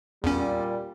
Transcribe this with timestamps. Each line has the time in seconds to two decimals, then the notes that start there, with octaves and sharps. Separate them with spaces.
0.24 E2 A#2 G3 C#4